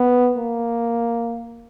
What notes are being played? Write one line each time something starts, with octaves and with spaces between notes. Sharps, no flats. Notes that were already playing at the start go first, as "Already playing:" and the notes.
Already playing: B3
A#3